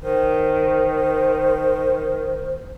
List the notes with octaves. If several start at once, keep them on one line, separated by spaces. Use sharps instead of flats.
D#3 C5